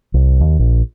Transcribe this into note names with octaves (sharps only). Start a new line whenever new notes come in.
C2
D#2
A#1